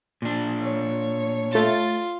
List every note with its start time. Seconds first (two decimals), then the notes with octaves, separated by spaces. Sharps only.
0.22 A#2 D4
0.62 C#5
1.53 A3 F4 A6